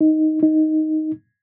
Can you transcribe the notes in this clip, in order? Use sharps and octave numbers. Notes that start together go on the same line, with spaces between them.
D#4
D#4